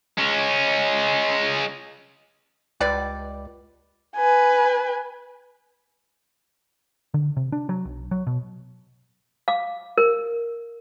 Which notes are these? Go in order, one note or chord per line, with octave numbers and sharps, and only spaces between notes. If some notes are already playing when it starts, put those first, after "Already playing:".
G#3 C#4
C#2 G3 B4 D5
B4 G#5
D3
C3
D4
F#3
B1
F#3
B2
F5 D6
A#4